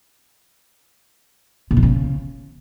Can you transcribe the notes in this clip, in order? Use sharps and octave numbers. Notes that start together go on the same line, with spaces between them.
B2
E3
C#3